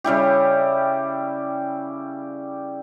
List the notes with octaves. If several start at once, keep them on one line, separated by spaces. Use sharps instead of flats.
C#3 G3 E4 G4